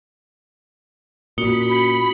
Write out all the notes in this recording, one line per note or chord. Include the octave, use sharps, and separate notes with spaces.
A#2 A#3 C#4 F#4 B5 D#6 C#7 G7